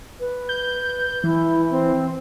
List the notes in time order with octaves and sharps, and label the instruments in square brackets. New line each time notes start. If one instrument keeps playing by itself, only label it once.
[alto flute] B4
[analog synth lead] G6
[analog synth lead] E3 [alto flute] E4
[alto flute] C4